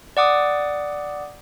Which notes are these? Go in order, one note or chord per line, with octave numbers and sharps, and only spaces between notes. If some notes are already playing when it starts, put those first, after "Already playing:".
D5 F#5 D6 D#6